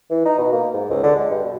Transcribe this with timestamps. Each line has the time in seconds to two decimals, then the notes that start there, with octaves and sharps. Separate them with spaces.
0.10 E3
0.25 D#4
0.38 B2
0.52 A#3
0.74 G#2
0.90 C#2
1.03 D3
1.16 G#3
1.31 G2
1.44 B2